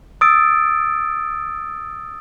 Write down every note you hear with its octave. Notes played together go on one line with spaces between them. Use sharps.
D#6 E6 A6 D7